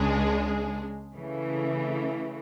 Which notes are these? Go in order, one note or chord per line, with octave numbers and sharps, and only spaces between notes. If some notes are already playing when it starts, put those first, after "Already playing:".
Already playing: C#2 C#3 G#3 D4 G#4
C#3 E3 A3